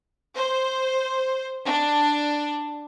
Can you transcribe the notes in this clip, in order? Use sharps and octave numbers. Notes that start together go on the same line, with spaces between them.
C5
D4